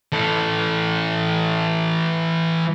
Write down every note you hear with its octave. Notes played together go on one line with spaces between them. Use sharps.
E3 A4